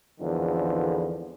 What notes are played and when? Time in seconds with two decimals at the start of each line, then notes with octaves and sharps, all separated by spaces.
0.19 G#1 E2 D3 D#3 F3